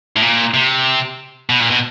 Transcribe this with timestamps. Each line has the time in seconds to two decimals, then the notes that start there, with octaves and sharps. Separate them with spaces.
0.16 A2
0.22 A#2
0.54 C3
1.50 B2
1.60 A#2
1.70 B2